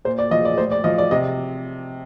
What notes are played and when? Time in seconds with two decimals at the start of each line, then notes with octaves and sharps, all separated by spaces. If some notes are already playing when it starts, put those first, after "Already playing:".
0.05 A#2 C5
0.19 D5
0.31 F3 D#5
0.45 D5
0.58 A2 C5
0.72 D5
0.84 F3 D#5
0.98 D5
1.11 C3 D#5